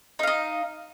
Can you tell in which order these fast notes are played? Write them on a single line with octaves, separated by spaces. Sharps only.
D#4 F5 D#5